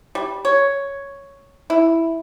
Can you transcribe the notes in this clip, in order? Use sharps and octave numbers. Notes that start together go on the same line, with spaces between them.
G3
C#5
E4